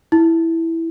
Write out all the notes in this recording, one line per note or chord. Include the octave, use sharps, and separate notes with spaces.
E4